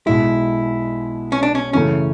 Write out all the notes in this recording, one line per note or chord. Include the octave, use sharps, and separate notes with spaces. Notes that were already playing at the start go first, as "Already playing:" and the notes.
B1 B2 G#3 E4
C#4
D4
C#4
F#2 C#3 E3 A3 C#4